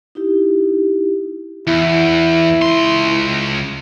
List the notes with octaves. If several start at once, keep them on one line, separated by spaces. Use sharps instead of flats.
D#4 E4 G4
E2 E4
C#2 C6